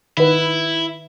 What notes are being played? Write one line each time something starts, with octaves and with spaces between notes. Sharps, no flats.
D#3 E4 B4